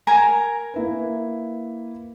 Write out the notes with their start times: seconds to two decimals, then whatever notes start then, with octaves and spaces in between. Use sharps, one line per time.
0.07 A#4 G#5 A#5
0.74 A#3 E4 B4